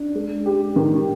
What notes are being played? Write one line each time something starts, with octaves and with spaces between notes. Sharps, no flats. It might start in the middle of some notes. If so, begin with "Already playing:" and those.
Already playing: D4
G#3
G4
D#3